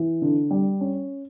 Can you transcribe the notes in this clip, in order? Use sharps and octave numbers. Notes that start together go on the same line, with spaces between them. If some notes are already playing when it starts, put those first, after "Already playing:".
Already playing: E3
D3
G3
C#4